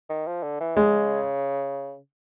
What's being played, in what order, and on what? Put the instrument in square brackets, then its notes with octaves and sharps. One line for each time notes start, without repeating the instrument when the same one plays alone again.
[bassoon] D#3
F3
D3
E3
[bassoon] C#3 [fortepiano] G#3